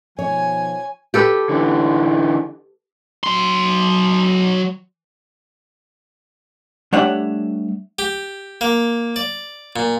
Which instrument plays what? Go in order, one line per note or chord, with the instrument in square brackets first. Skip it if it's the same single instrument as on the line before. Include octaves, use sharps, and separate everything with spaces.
[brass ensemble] B2 D#3 F3 [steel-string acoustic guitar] C#5 [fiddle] G#5
[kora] G4 A4 B4
[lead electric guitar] D3 E3
F#3 C6
[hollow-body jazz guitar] G3 A3 D4 C#5 E5 F#5
[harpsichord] G4
A#3
D5
A#2